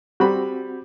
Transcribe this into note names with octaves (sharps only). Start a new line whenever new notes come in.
G3 C4 F#4 B5